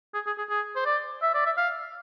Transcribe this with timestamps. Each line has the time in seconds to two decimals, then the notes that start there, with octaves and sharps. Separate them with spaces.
0.14 G#4
0.27 G#4
0.38 G#4
0.49 G#4
0.76 C5
0.86 D5
1.22 E5
1.34 D5
1.46 E5
1.58 F5